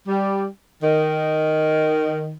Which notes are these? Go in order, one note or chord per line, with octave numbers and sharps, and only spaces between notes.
G3
D#3